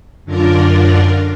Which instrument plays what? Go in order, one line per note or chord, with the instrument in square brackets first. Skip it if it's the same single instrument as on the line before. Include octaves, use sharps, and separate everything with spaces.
[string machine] F#2 D3 D4 F4 A#4 D5